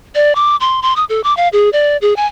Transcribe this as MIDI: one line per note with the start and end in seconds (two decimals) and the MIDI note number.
0.15 0.35 74
0.35 0.56 86
0.60 0.80 84
0.82 0.95 84
0.96 1.05 87
1.09 1.23 69
1.24 1.36 86
1.37 1.49 77
1.53 1.70 68
1.73 1.97 74
2.02 2.16 68
2.16 2.26 80